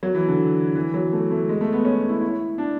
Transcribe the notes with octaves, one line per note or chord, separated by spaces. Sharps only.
F#3
E3
D3
E3
F#3
A3
A3
G#3
A3
B3
C#4
E4
E4
D4